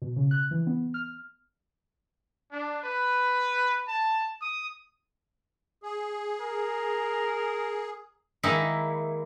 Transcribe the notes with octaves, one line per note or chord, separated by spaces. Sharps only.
B2
C#3
F#6
E3
B3
F6
D4
B4
A5
D#6
G#4
A#4
D#3 G#3 A#3 D#4 E4